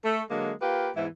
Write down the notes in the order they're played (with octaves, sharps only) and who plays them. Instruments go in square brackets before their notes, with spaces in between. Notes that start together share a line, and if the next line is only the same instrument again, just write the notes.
[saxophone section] A3
D3 F#3 G#3 A#3
A#3 F4 G4 B4
E2 G#2 E3 E4